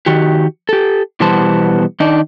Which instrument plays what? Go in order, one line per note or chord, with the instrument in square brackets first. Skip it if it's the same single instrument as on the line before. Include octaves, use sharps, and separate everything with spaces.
[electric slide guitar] D#3 F#4 G4
G4 A4
B2 E3 G3 B3 C5 A5
D#3 D4 D#4